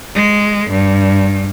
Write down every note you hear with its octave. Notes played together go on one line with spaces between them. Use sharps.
G#3
G2